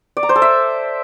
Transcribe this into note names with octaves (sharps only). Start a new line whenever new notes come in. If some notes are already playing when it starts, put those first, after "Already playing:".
D5
A#5
C5
A4
E5